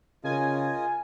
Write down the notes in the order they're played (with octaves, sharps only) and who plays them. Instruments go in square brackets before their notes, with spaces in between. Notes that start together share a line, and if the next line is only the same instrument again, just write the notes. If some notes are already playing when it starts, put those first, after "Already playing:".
[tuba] C#3 [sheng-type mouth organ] F4 A#4 D#5 [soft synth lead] G#5